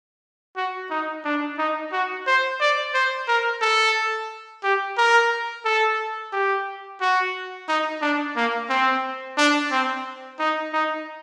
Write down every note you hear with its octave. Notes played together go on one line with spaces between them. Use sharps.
F#4
D#4
D4
D#4
F#4
C5
D5
C5
A#4
A4
G4
A#4
A4
G4
F#4
D#4
D4
A#3
C4
D4
C4
D#4
D#4